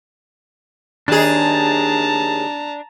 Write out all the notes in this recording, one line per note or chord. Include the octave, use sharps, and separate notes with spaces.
D#2 D4 G#4 A5 A#5